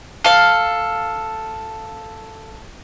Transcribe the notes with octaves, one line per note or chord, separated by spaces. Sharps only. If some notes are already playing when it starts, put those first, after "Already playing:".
A4 F5